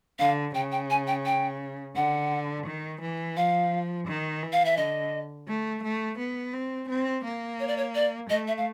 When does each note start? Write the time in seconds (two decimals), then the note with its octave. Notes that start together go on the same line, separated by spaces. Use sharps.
0.19 D3 F5
0.55 C#3 G5
0.72 G5
0.90 G#5
1.07 G5
1.26 G5
1.96 D3 F#5
2.67 D#3
3.02 E3
3.37 F3 F5
4.08 D#3
4.43 E3
4.53 F5
4.65 E5
4.77 D3 D#5
5.48 A3
5.83 A3
6.19 B3
6.54 C4
6.89 C4
7.24 A#3
7.60 C#5
7.68 D5
7.77 C#5
7.95 D5
8.30 A3 D#5
8.48 E5
8.58 F5